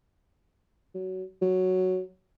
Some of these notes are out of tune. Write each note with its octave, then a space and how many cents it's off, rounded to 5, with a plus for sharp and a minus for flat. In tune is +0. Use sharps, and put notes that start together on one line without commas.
F#3 +15
F#3 +0